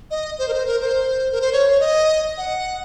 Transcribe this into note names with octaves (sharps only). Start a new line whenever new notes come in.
D#5
C5
A#4
C5
A#4
C5
A#4
C5
C#5
C#5
D#5
F#5